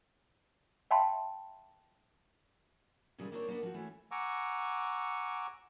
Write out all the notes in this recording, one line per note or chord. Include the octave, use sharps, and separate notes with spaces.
E5 F5 G5 A5 B5 C6
A#2 C#3 E3 G3 G#3
A#3 C4 D4 D#4 A#4 C#5
A#3 B3 D4
F3 F#4
E3 A3 C#4
F#5 G#5 A#5 C#6 D6 E6